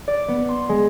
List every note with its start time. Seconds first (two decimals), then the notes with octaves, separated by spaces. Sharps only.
0.08 D5
0.28 B3
0.49 C6
0.69 G#3